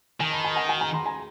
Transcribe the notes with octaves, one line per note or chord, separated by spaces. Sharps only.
D#3 G#5 A#5
A5 B5
G#5 A#5
F#5 G#5
F#5 G#5
G#5 A#5
A#5 C6
G#5 A#5